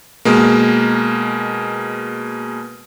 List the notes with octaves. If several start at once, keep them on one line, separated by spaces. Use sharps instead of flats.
B2 G#3 A#3